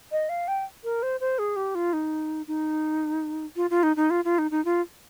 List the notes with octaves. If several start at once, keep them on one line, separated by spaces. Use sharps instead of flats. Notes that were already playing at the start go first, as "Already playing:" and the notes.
D#5
F5
G5
A#4
C5
C5
G#4
G4
F4
D#4
D#4
F4
F4
D#4
D#4
F4
F4
D#4
D#4
F4